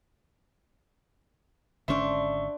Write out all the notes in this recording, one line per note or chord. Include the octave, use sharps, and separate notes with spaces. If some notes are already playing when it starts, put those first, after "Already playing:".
G#1 D3 C#4 D4 C5 E5 C6 C#6